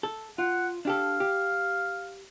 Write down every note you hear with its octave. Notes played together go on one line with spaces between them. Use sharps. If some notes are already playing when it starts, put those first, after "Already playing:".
A4
F4 F#5
D4 G4 A4 F5
G4